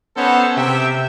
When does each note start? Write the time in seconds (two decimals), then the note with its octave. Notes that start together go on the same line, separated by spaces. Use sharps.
0.16 B3 C#4 D#4 A4 C5 C#5
0.55 C3 E5 G5